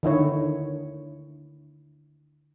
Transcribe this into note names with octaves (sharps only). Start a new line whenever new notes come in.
D3 D#3 E4 C#5